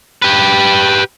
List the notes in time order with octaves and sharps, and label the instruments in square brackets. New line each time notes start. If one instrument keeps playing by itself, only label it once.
[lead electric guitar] G4 B4